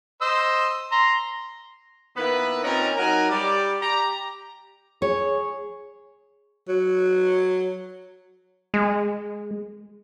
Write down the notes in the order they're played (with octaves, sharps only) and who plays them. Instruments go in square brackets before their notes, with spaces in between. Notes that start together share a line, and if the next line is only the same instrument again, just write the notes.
[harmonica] C5 D#5 E6
A#5 C6
[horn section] D#3 A#3 B3 E4 B4
A#2 C4 C#4 D#4 A#4
F#3 D#4 A#4 F#5 G#5 A#5
G3 G4 D5
G4 A#5
[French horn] G#4 [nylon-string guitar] C#5
[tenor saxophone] F#3
[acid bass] G#3